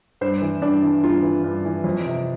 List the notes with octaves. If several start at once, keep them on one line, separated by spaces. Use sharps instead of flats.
G2 C5
E3
G2 D4
E3
G2 F4
E3
G2
E3
F2
C3